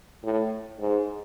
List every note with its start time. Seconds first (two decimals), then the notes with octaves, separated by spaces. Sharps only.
0.24 A2
0.81 G#2